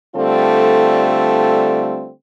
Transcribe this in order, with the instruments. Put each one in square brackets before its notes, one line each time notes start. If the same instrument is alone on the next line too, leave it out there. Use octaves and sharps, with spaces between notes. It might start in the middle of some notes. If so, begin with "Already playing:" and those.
[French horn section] D3 G3 A3 C4 F4 A4